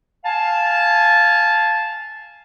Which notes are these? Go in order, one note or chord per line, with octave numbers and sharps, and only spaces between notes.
F5 G#5 A5